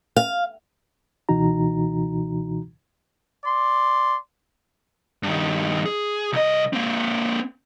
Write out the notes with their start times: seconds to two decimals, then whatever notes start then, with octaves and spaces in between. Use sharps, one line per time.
0.16 F5
1.29 C#2 B2 E3 D#4 F#4 A#5
3.45 D5 C6
5.23 G2 D#3
5.86 G#4
6.33 C2 D#5
6.73 A#3 C4